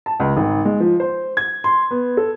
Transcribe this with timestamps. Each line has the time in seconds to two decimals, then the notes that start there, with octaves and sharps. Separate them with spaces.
0.06 A5
0.20 C#2
0.37 G#1
0.65 G#3
0.80 F3
1.00 C5
1.37 G#6
1.64 C6
1.91 B3
2.17 A4